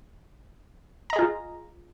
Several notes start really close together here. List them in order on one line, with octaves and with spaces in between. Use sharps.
A#5 D#5 G#4 F4